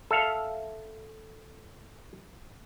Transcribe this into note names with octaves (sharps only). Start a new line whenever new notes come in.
A4 E5 F5